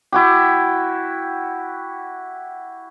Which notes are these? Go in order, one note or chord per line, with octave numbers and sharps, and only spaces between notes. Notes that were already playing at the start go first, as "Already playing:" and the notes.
E4 F#4 G4